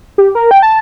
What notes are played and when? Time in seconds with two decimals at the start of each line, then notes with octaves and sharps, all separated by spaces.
0.18 G4
0.35 A#4
0.51 G5
0.62 A5